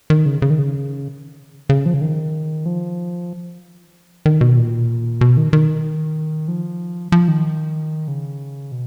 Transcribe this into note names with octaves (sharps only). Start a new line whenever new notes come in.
D#3
C#3
C#3
D#3
C#3
C#3
F3
C#3
D#3
F3
D#3
B2
A#2
B2
D#3
D#3
F3
F3
D#3
C#3
B2